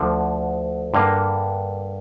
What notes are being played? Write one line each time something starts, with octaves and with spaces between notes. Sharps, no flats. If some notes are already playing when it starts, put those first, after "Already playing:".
Already playing: D2 D3 F3
G2 D3 A#3